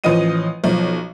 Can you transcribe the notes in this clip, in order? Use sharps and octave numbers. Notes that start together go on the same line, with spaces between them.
A1 F3 C#4 F4 D#5 D#7
B1 F3